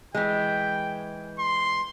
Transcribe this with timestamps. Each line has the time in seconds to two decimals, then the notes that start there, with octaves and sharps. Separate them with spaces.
0.15 E3 G#3 G5
1.39 C6